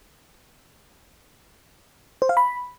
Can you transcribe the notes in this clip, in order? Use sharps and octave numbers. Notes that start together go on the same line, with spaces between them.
C5
F5
B5